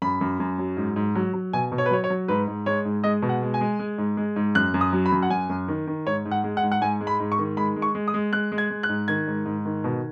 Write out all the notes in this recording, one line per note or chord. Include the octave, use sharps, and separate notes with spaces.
F#2 B5
F#2
F#2
F#3
G#2
G#2
F#3
F#3
B2 G#5
B2
C#5
B4
F#3 C#5
C#5
F#3
G#2 B4
G#2
G#3 C#5
G#2
G#3 D#5
B2
F#5
G#3
G#5
G#3
G#3
G#2
G#3
G#2
F#2 F#6
F#2
D#6
F#3
B5
F#2
F#5
F#2 G#5
F#2
D#3
D#3
G#2 C#5
G#2
F#5
G#3
F#5
G#2
F#5
G#2 G#5
G#3
B5
G#2
C#6
D#3
G#3 B5
G#3
C#6
G#3
D#6
G#3
G#3 F#6
G#3
G#6
G#3
F#6
G#2
D#3 G#6
G#2
G#2
D#3
B2